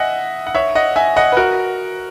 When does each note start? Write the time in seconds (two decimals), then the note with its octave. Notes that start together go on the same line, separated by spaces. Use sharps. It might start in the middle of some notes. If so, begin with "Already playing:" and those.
Already playing: D#5 E5 F#5 G#5
0.47 F#5
0.55 C#5 E5
0.75 D#5 F#5
0.96 E5 G#5
1.16 D#5 F#5
1.32 B4
1.37 F#4 A#4